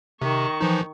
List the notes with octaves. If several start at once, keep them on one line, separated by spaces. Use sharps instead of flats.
C3 D#3 C#6
E3 F3 D#4